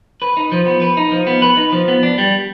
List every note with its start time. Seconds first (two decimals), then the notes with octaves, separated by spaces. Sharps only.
0.22 B4
0.37 D#4
0.52 F3
0.66 B3
0.82 B4
0.97 D#4
1.11 F3
1.27 B3
1.42 B4
1.57 D#4
1.72 F3
1.88 B3
2.03 D4
2.18 G3